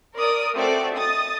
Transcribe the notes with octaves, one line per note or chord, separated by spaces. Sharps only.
A#4 D5 D#6
A3 C4 F#4 D5
D#5 D#6 A6